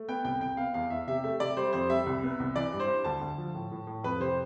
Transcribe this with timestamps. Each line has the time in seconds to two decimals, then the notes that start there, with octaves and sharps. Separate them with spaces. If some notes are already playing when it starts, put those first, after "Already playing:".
Already playing: A3
0.08 B3 G5
0.24 C2 G5
0.41 C2 G5
0.57 B3 F5
0.74 E2 F5
0.90 E2 E5
1.07 C3 E5
1.24 A3 E5
1.40 C3 D5
1.57 G3 C5
1.73 F2 C5
1.89 G3 E5
2.06 C2
2.23 B3
2.40 C2
2.55 E3 D5
2.73 G2
2.80 C5
2.88 D4
3.04 D2 A5
3.21 D2
3.38 F3
3.54 A2
3.72 A2
3.87 A2
4.03 F2 B4
4.20 C3 C5